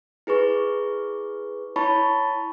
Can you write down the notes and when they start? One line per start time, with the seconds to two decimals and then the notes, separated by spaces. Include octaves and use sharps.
0.27 E4 G#4 B4 C#6
1.76 E4 C#5 A5 B5 C#6 A6